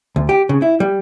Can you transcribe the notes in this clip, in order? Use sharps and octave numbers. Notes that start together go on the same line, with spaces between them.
D2
G4
C#3
E4
G3